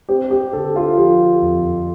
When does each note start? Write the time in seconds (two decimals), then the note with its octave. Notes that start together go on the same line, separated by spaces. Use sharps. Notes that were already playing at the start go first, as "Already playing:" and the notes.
0.09 C4 G4
0.31 G4
0.53 D3 A4
0.76 F4
0.97 F3 G4
1.42 F2